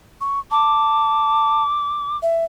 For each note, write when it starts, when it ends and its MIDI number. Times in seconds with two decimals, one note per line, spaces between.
0.21 0.40 85
0.51 1.63 81
0.51 2.17 86
2.22 2.44 76